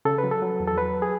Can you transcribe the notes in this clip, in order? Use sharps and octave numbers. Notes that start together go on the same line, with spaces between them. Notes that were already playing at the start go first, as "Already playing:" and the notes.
C#3 A4
B4
F#3
A4
F#3
E2
A4
F#3 B4
G#4